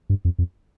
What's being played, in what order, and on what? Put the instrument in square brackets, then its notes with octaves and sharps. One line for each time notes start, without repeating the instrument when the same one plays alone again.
[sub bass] G2
F2
F2